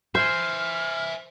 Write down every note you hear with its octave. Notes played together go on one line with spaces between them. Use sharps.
C5 E5 G#5 F6